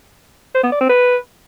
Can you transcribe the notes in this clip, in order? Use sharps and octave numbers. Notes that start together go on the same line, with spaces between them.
C5
B3
D5
C4
B4